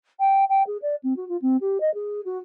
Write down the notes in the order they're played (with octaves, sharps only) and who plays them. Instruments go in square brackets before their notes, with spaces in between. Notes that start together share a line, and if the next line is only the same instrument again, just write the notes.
[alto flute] G5
G5
G#4
D5
C4
F#4
F4
C4
G4
D#5
G#4
F#4